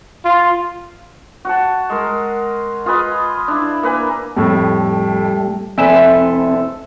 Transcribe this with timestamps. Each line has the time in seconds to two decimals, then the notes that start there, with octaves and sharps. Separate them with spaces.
0.25 F4
1.45 F#4 F#5 A5
1.90 G#3 A#4
2.86 F4 G#4 B4 D#5
3.48 D4 E4
3.83 A#3 B4 G#5
4.36 F2 A2 G3 A3
5.78 F1 C4 E4 A4 B4 G#5 E7